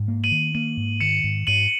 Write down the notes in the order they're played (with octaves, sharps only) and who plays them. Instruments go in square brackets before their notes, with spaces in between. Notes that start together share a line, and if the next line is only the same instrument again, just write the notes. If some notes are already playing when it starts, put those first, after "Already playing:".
Already playing: [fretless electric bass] G#2
A#3
[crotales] D#7 F#7
[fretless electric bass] D#3
[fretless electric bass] A#3 [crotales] D#7 F#7
[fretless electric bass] G#2
[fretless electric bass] D#3 [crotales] C#7 E7
[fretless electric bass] G#2
[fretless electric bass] G#2 [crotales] D#7 F#7